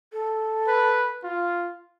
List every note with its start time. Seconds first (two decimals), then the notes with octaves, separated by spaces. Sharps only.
0.12 A4
0.68 B4
1.24 F4